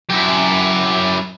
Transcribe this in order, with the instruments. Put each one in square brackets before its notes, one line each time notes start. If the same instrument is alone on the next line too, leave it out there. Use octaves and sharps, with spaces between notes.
[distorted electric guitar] F#2 [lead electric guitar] E4 G4